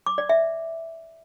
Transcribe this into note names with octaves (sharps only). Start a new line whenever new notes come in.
D6
D5
E5